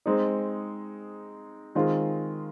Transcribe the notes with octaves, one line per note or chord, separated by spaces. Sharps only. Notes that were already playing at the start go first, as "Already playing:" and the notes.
G#3 C4 D#4
D#3 G#3 C4 F4